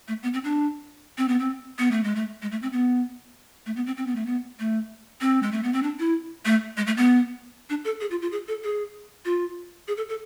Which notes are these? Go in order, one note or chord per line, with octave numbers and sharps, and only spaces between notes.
A3
B3
C4
D4
C4
B3
C4
B3
A3
G#3
A3
G#3
A3
C4
B3
A3
B3
C4
C4
B3
A3
B3
A3
C4
G#3
A3
B3
C4
D4
E4
A3
G#3
A3
B3
D4
A4
G#4
F4
F4
G#4
A4
G#4
F4
G#4
A4
A4